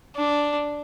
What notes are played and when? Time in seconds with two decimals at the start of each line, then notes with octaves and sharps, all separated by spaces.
0.16 D4